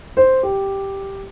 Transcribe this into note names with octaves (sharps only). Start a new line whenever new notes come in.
C5
G4